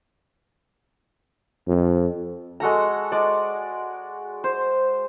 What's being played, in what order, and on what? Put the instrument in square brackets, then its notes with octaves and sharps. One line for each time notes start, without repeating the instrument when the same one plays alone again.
[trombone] F2
[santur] G#3 F#4 A4 A#5
G#3 D5
C5